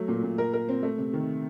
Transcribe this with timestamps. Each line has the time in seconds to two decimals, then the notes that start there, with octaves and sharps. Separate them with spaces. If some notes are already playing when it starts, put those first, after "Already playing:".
Already playing: F#3 A3
0.08 A#2
0.23 A#2
0.38 A#4
0.53 A#4
0.69 C4
0.83 A3
0.98 C3
1.13 D#3